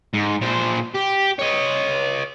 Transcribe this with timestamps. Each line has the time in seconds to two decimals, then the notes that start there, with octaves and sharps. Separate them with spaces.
0.14 G#2
0.41 A#2 C5
0.95 G4
1.39 C#5 D#5